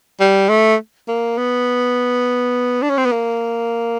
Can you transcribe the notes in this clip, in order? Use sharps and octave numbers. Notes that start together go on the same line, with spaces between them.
G3
A3
A#3
B3
D4
C#4
C4
B3
A#3